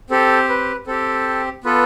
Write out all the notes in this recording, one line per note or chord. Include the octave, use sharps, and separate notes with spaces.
C4 G4 A4
B4
C4 G4 A4
B3 F4 A4 B4